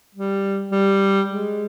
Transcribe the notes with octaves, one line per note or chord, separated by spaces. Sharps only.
G3
G3
G#3